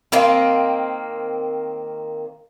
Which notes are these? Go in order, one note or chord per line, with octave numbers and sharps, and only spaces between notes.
D#3 A#3 C4